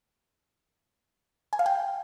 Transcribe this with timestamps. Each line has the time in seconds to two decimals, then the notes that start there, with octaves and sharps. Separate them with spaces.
1.53 G#5
1.59 F5
1.66 G5